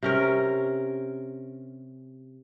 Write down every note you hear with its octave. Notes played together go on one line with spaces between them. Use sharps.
C3 C#4 A#4